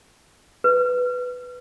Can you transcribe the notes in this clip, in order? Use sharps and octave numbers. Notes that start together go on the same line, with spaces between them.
B4